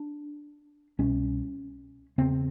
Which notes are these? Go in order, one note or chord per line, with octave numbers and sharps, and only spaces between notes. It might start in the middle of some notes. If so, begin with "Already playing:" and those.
Already playing: D4
C2 B2 C#4
E2 C#3 C4